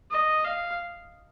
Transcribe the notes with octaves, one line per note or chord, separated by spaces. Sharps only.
D#5
F5